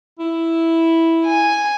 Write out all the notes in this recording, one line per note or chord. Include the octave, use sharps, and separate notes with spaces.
E4
G#5